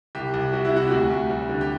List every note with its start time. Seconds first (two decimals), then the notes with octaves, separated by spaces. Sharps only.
0.15 C2 G4
0.34 C2
0.53 G3 F#4
0.65 E4
0.72 C3 F#4
0.87 G4
0.91 D2 F#4
1.10 D2
1.30 G3
1.49 D3
1.61 G4